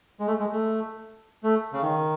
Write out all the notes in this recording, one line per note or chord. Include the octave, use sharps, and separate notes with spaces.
G#3
A3
G#3
A3
A3
C#3
D#3